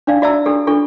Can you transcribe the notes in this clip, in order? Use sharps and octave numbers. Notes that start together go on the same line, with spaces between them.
D4 D#4 D5 F5
F#4 D5 E5 A5 A#5 E6
D4 G4 A4
D4 F4 A4 C#6